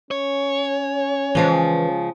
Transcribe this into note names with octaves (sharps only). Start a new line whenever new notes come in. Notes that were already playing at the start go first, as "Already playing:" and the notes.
C#4 C#5
C#3 E3 F3 G#3